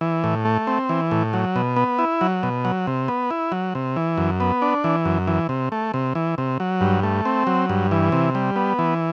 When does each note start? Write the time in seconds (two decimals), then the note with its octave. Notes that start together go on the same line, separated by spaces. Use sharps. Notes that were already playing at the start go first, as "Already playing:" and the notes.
0.01 E3
0.24 A2
0.45 A3
0.67 C4
0.89 E3
1.11 A2
1.33 F#3
1.56 B2
1.76 B3
1.99 E4
2.21 F#3
2.43 B2
2.65 F#3
2.87 C3
3.08 B3
3.31 E4
3.52 F#3
3.75 C3
3.96 E3
4.18 F#2
4.40 B3
4.62 D4
4.84 E3
5.05 F#2
5.28 E3
5.49 C3
5.72 A3
5.94 C3
6.15 E3
6.38 C3
6.60 F#3
6.81 G2
7.03 A3
7.25 C4
7.47 F#3
7.69 G2
7.91 E3
8.12 C3
8.35 G3
8.56 B3
8.79 E3